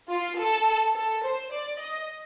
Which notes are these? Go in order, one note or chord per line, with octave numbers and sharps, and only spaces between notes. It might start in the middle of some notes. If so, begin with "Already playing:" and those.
F4
A4
A4
C5
D5
D#5